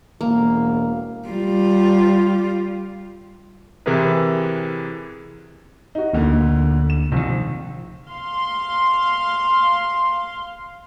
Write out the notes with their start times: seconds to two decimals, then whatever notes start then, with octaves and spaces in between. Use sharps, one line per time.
0.21 E1 A#3
1.28 G3 F4
3.86 C3 E3 E4 G#4 A#4 B4
5.95 D#4 F#4
6.13 D2 A#2 D3
6.90 E7
7.12 A#1 C3 D#3
8.09 F5 C6